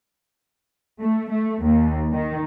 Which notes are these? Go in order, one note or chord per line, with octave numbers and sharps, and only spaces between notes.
A3
A3
D#2
D#3